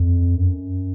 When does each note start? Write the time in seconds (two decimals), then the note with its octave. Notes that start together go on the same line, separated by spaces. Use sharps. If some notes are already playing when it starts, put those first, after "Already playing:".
Already playing: F2
0.35 F#2